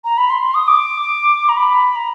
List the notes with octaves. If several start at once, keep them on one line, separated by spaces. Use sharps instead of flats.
A#5
B5
C6
C6
D#6
D6
A#5
B5
A#5